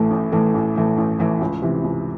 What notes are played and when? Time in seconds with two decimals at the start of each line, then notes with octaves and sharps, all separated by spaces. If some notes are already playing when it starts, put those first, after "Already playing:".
Already playing: A1 A2 E3 A3
0.11 A1
0.32 A2 E3 A3
0.54 A1
0.76 A2 E3 A3
0.98 A1
1.19 A2 E3 A3
1.41 C#2
1.62 C3 E3
1.84 C#2